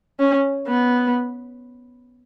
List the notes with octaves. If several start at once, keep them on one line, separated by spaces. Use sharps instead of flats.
C#4
B3